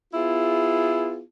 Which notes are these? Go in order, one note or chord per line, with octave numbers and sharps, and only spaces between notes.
B3 E4 F4 G#4